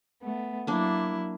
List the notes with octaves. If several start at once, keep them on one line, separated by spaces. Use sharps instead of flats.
A3 B3
F#3 A#3 D4 E4